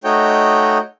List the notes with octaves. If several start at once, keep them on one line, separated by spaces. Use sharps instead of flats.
A3 D#4 F#4 C#5 D#5 G5